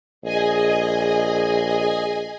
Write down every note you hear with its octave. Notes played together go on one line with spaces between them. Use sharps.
A#1 G#4 D#5 G#5